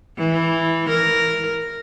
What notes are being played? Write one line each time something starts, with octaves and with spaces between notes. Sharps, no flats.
E3
A#4